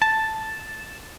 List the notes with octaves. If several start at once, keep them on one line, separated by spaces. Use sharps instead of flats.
A5